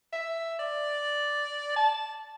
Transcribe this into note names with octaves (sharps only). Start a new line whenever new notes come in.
E5
D5
A5